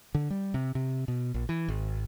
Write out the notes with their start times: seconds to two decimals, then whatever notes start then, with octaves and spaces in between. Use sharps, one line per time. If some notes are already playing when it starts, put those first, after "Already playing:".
0.15 D3
0.30 G3
0.54 C3
0.75 C3
1.08 B2
1.34 A#1
1.49 E3
1.68 G#1